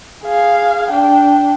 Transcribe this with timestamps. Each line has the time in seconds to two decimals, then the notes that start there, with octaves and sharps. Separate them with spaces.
0.24 G#4 F5
0.91 D4 G5